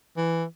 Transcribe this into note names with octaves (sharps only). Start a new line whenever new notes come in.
E3